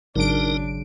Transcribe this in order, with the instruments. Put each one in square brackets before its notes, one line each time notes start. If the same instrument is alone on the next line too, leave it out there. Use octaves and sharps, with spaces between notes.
[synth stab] G#1 D7 [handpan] C#3 F#3 [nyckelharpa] D4 [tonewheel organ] D#4 A#4